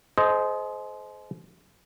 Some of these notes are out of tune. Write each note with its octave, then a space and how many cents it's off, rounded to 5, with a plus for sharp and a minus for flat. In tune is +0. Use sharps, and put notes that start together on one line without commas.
G#4 +45 C5 -10 D#5 +0